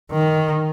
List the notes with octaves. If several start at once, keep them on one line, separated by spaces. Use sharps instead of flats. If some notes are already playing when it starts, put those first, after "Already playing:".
D#3